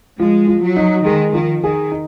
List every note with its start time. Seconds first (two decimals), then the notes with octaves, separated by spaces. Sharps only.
0.20 F3 G#3
0.47 F3
0.63 F#3
0.76 D#4
1.05 D#3 G#3
1.34 D#3 F3
1.63 D#3 G#4
1.92 D#4